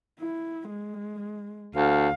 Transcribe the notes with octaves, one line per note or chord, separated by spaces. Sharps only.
E4
G#3
D2 F5